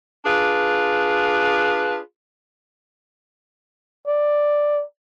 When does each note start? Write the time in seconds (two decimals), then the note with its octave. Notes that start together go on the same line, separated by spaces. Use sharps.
0.25 D4 F4 G#4 B4
4.07 D5